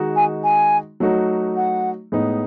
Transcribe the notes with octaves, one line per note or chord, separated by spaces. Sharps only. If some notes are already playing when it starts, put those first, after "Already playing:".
Already playing: D#3 G#3 D#4 F#4
G#5
G#5
F#3 A3 D#4 F#4
F#5
A2 G#3 B3 D#4